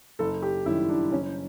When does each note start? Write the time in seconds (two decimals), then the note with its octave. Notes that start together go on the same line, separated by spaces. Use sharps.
0.19 F#1 A4
0.42 G4
0.66 F#2 D#3 G3 E4
0.89 D4
1.11 F#1 C#4